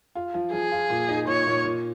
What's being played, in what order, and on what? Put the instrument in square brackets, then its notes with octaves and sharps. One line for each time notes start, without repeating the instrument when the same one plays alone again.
[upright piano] F4
F3
[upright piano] F3 [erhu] G#4
[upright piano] F4
A#2
D#4
[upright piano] A#2 [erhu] C#5
[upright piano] A#2
A#2